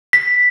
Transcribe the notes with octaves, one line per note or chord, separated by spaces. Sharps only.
B6